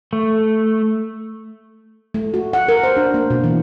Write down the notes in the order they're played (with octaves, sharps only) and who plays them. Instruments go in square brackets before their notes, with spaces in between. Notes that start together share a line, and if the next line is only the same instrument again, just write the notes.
[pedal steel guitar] A3
[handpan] A3
F#4
F#5
A#4
C5
D4
A#3
B2
E3